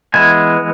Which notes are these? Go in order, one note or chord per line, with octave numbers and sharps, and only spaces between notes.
E3 G#3 B3 G#5